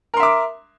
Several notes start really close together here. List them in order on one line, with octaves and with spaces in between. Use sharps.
A#4 C6 E5 D6